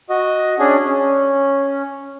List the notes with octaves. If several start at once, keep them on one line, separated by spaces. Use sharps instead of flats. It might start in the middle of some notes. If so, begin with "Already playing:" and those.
F#4 D#5
C#4 D4 G#4
C#4